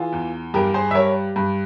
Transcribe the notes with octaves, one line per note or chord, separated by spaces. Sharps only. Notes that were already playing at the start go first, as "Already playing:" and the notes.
Already playing: E3 F4 G#4
E2
G2 G4 A#4
G#4 C5
E5
G3 A#4 C#5
G2